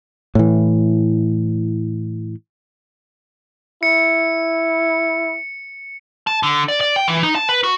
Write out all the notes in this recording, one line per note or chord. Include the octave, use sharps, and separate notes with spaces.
A2 E3
E4 C#7
A5
D3
D5
D5
G5
E3
D#4
A5
B4
F#4